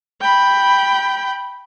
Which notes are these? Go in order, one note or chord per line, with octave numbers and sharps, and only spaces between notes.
G5 B5